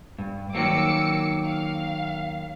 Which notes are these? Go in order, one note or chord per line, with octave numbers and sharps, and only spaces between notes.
G2
D#3 F#3 A#3 D6 E6 C#7
F5